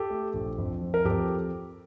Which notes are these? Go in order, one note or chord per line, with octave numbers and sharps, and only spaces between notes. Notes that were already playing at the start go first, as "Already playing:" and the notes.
Already playing: G4 A4
A3
A#1
F2
F3
A#4
F2 G4 A4